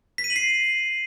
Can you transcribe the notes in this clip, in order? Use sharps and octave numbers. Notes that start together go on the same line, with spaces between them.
B6
D#7
F#7
C7